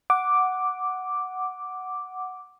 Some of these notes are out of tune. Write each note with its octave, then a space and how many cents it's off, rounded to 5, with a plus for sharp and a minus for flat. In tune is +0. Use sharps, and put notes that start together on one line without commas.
F#5 +0 D6 +0